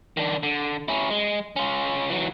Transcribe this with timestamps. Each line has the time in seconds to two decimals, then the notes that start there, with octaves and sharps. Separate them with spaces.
0.17 D#3 D4
0.43 D3
0.88 C#4 E4
1.10 G#3
1.56 C#4 F4
2.10 E3 F#3